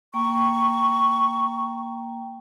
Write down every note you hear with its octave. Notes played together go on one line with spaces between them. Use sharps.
A#3 G5 A#5 C#6